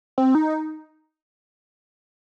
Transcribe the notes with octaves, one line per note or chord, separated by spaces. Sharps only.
C4
D#4